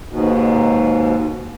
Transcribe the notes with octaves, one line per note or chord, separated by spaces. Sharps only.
D#2 G#2 B2